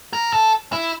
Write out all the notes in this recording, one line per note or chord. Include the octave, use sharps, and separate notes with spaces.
A#4
A4
E4